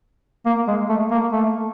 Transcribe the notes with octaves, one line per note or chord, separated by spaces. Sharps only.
A#3
G#3
A3
A#3
A3